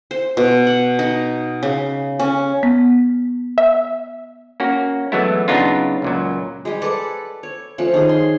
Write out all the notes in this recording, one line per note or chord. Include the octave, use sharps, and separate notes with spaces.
C5
B2
F#5
D#4
C#3
C#4
B3
E5
A#3 C#4 F#4
E3 F#3 G#3 A3 B3 E4
C#3 F#3 B3 D4 D#4 F4
C#2 A#2 F#3
G3 G#3
A4 B4 D5 F#5
C#5
F3 A3 C#4
D#3 G#4
C6